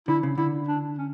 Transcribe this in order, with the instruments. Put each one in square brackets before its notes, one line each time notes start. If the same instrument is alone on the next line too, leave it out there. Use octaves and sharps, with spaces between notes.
[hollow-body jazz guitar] D3 [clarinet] E4
[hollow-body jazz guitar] C#3
[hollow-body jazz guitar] D3 [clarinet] E4
[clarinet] D4
C#4